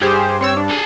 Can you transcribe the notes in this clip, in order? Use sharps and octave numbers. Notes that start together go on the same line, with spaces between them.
G2 G4 G#4 C5
C4 C#5 E6
D4
G#4 A4